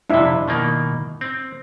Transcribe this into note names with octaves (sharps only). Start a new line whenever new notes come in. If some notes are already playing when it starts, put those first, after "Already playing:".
F2 C3 D4 E4 E5
B2 D#3 A#3
C4